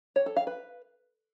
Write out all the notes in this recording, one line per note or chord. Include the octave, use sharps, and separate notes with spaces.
C#5
A4
F5
B4